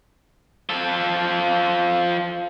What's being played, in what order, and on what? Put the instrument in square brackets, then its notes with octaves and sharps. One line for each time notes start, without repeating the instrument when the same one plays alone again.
[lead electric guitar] F3 A4